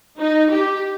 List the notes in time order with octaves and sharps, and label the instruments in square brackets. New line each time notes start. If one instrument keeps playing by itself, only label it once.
[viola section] D#4
G4